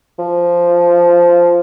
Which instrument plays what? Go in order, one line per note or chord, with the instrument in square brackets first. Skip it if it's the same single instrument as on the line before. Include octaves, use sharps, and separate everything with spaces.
[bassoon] F3